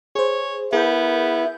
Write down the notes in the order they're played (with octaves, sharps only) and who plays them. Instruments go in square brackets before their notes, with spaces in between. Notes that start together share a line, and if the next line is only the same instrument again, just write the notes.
[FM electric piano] G#4 C5 [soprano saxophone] C#5
[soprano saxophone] B3 [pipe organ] E4 [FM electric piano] G#4 A#4 G6